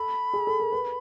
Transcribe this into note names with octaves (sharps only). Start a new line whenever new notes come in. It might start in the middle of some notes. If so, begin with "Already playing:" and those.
Already playing: A4 B5
G#4
A4
A#4
B4